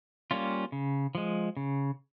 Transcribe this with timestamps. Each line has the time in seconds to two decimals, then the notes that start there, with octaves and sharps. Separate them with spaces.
0.31 G3 A#3 C#4 F4
0.72 C#3
1.15 F3 G#3
1.57 C#3